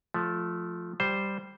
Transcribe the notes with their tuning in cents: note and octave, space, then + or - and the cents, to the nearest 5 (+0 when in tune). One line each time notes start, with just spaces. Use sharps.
F3 +0 A3 -10
G3 +0 C5 +0